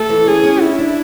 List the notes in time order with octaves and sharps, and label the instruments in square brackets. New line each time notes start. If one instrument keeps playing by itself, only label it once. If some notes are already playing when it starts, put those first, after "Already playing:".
Already playing: [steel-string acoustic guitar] A3 [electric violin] A4
[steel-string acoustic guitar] E3
[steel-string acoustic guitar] C#4 [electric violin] G#4
[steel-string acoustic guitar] C#4
[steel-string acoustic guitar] D4 [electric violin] E4
[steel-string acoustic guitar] D4